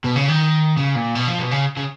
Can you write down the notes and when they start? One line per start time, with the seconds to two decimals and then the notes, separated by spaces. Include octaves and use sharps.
0.04 B2
0.16 C#3
0.28 D#3
0.77 C#3
0.96 A#2
1.15 B2
1.27 F3
1.39 B2
1.51 C#3
1.77 C#3